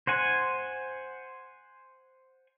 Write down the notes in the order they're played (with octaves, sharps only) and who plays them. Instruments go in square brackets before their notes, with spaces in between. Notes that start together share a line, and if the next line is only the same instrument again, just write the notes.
[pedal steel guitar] C5 F#5 G#5